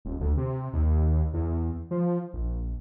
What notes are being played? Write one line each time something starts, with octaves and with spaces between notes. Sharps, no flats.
D#1
D2
C3
D#2
E2
F3
A#1